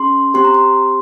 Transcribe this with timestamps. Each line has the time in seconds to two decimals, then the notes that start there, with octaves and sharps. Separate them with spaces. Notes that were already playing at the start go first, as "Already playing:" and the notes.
Already playing: C#4 G#4 C6
0.34 C4 G4 C6
0.45 A#5
0.54 C6